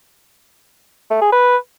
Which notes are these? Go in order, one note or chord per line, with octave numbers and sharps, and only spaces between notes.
A3
G#4
B4